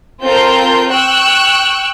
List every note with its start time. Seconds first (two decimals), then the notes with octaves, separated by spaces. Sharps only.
0.23 C4 F4 A4 A#4 G6
0.90 G5 C#6 E6 F#6